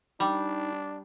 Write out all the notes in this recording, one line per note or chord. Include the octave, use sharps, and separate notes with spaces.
G3 D4 D#4